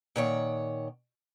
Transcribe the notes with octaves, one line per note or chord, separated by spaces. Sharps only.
A#2 D#3 C#5 F#5